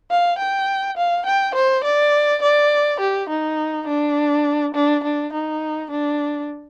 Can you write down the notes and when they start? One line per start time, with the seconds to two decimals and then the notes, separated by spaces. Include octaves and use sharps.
0.10 F5
0.38 G5
0.97 F5
1.26 G5
1.55 C5
1.84 D5
2.42 D5
3.00 G4
3.29 D#4
3.87 D4
4.74 D4
5.04 D4
5.33 D#4
5.91 D4